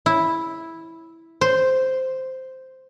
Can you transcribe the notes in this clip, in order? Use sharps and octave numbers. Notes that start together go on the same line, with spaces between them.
E4
C5